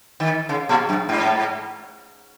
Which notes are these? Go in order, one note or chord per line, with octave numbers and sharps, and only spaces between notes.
D#3
C#3
A#2
F#2
G#2